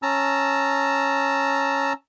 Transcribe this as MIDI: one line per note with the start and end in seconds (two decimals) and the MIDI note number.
0.02 1.93 61
0.02 1.93 81
0.02 1.93 82
0.02 1.93 88